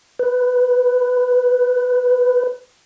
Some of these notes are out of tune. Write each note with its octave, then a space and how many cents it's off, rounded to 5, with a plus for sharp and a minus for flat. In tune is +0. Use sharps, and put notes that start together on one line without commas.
B4 +10